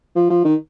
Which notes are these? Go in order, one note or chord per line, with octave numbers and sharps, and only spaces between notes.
F3
F3
D#3